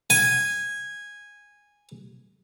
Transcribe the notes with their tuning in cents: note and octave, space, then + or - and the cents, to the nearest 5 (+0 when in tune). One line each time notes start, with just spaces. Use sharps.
G#5 -10